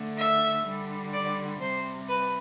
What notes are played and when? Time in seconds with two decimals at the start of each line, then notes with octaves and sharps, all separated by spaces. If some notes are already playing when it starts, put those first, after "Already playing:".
Already playing: D3 A3
0.18 E5
0.66 D3 G3
1.13 D5
1.60 C3 G3 C5
2.08 B4